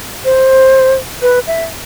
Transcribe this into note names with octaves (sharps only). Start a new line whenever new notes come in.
C5
B4
E5